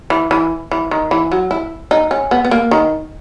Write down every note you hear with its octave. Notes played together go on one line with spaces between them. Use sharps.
E3
E3
E3
D#3
E3
F#3
E4
D#4
C#4
B3
B3
A#3
D#3